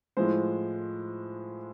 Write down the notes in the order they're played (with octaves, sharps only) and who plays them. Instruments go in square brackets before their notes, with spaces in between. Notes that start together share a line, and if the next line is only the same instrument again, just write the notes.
[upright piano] A2 F3 G#3 C5